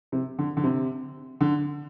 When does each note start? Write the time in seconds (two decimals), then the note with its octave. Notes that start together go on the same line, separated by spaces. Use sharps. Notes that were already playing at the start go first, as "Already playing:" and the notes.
0.12 C3
0.39 D3
0.57 D3
0.63 C3
1.41 D3